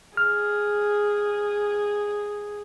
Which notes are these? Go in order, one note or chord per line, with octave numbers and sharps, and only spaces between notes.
G#4 F6